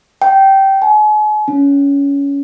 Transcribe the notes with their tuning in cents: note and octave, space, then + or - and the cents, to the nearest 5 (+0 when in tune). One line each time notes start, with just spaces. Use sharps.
G5 -15
G#5 +40
C#4 +20